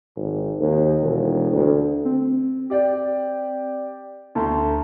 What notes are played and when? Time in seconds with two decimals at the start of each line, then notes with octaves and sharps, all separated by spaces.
0.16 G#1
0.60 D#2
1.01 E1
1.52 D2
2.05 C4
2.70 G4 D5 G5
4.35 D2 A5 A#5 C6